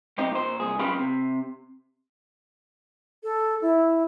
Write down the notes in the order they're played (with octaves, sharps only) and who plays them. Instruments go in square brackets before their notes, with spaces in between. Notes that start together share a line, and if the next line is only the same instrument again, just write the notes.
[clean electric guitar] B1 C4 D#4 G4
A#2 C5
C2 G#4
F#2 C#3 F4 G4 B4
C3
[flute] A4
E4